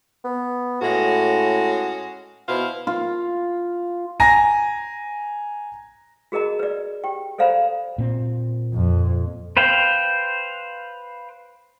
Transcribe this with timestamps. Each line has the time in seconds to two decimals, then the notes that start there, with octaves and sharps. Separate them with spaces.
0.24 B3
0.82 A2 G#3 C#4 F#4
2.48 B2 E4 C5 F5
2.87 F4
4.20 G#5 A#5 A#6
6.32 F#4 G#4 A#4 D#5 A#5
6.59 B4 D5
7.04 G4 G5
7.38 A4 C5 D5 F5 A#5 B5
7.98 A#2 C4
8.74 F2
9.57 B4 C5 F5 G5